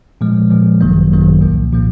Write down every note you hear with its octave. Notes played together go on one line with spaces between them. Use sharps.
A#2 F3 G#3
A#2 F3 G#3
G#1 F#2 D#3 F#3 A#3
G#1 F#2 D#3 F#3 A#3
C2 A#2 F3 A#3
A#2 F3 A#3